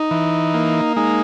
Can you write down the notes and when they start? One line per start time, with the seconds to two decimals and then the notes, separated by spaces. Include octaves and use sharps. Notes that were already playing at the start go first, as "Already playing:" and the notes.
Already playing: D#4
0.11 E3
0.54 A#3
0.96 G#3 D#4